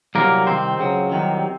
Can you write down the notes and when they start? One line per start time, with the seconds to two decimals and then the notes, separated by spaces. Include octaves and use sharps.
0.15 C2 C3 F#3 A#3 A#4
0.47 C2 C3 D#3 C4 C5
0.79 C#2 C#3 F#3
1.11 C2 C3 D#3 F#3